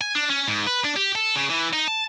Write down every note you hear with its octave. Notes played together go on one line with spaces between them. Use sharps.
G#5
D4
C#4
G#2
B4
D4
G4
A4
C#3
E3
D#4
A5